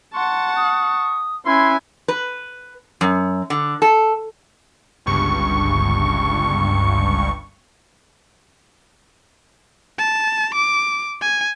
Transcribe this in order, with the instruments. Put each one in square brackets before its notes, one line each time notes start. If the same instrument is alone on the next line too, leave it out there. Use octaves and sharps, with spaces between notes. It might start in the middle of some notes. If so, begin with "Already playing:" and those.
[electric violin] F#5 A5 [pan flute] C6 [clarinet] C#6
[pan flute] D#6
[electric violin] C#4 G#5 [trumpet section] E4 B4 [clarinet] C6
[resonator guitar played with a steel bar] B4
F#2
D3
A4
[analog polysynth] G1 C#2 G2 C#6
[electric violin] A5
D6
G#5